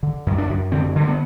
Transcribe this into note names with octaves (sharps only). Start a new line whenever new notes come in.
D3
F#2
D4
F#2
D3 C4
D3
A3
B3